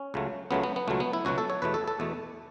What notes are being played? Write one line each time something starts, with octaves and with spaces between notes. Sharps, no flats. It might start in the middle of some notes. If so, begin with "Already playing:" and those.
Already playing: C#4
C#2 C#3 F#3 A3
C#2 C#3 F#3 A3 B3
B3
B3
C#2 B2 F#3 A3
B3
E4
C#2 B2 F#3 F#4
A4
C#5
E2 B2 A3 B4
A4
A4
E2 B2 A3